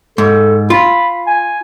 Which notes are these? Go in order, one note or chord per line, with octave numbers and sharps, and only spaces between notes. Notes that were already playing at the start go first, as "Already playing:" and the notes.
G#2 A4
F4 B5
G#5